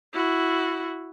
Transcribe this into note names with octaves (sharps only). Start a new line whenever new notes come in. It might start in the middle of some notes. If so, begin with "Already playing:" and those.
E4 F#4